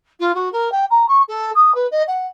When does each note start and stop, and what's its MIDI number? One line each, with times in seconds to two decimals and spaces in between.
0.19 0.31 65
0.34 0.51 66
0.52 0.71 70
0.71 0.84 79
0.90 1.05 82
1.08 1.21 85
1.28 1.50 69
1.54 1.74 87
1.74 1.86 71
1.91 2.02 75
2.07 2.26 78